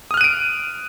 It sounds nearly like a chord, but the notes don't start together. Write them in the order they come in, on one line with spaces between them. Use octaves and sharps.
D#6 F6 F#6 D#7 D7